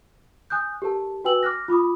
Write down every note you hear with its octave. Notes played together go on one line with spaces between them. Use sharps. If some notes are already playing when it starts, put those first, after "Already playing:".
G#5 D#6 F#6 G6
G4 A4 A#4 A5
F#4 B4 G5 G#5 E6 F#7
D6 F6 F#6 A#6
F4 B5 D6 D#6